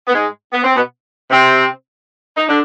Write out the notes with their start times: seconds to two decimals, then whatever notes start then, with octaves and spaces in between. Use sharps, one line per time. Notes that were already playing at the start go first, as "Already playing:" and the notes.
0.08 B3
0.14 G#2 G#3
0.53 B3
0.64 C4
0.76 B2 B3
1.31 C3 C4
2.37 D#4
2.49 D3 D4